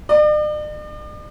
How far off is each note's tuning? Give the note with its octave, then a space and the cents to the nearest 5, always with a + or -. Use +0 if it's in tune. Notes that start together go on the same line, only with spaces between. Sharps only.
D5 +45